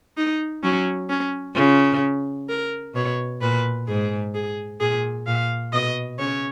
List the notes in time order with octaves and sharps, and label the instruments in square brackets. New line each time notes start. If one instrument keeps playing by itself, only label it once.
[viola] D#4
[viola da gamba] F#3 [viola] C#4
[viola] C#4
[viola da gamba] C#3 [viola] F4
[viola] A#4
[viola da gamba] B2 [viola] C#5
[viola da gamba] A#2 [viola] B4
[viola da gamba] G#2 [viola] G#4
[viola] G#4
[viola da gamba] A#2 [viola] G#4
[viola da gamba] A#2 [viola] F5
[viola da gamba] B2 [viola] D#5
[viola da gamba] C#3 [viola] C#5